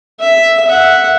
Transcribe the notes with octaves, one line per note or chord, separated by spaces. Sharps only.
E5
E5 F#5